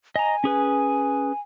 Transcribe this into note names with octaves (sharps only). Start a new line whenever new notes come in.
D#5 G#5 A#5
C#4 G#4 B4